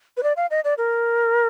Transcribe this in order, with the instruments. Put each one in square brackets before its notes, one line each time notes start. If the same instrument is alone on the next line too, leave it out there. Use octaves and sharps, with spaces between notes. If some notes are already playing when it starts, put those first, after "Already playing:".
[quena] B4
D5
F5
D#5
D5
A#4